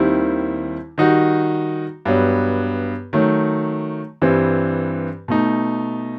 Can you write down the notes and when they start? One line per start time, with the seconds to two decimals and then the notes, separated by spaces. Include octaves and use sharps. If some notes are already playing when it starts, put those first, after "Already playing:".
Already playing: D#2 D#3 G3 C4 E4
0.98 D#3 G3 D#4 F#4
2.05 G2 F#3 B3
3.13 D#3 F#3 A3
4.22 G2 E3 G3 C4
5.28 B2 A3 D#4